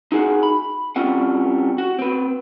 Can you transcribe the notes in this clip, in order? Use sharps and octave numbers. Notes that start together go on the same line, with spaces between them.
D#4 F#4 G#4 F#5
B5
G3 C4 C#4 F4 F#5
F#4
C4 B4